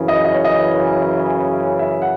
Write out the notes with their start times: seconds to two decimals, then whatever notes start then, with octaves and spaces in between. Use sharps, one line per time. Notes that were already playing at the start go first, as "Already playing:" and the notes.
Already playing: F#2 C#3 E3
0.08 D#5
0.25 D#5
0.34 C#5
0.45 D#5
1.79 E5
2.02 F#5